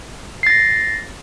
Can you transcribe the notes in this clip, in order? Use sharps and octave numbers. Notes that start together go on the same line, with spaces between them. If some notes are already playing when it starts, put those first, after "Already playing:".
A6 A#6 C7